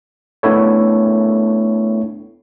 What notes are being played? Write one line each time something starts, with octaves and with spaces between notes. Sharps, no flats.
A3 B3 D4 E4 A4 C#5